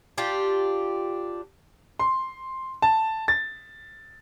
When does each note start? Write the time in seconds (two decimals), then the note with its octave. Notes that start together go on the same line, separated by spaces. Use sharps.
0.18 D4 F4 G4
1.99 C6
2.82 A5
3.28 A6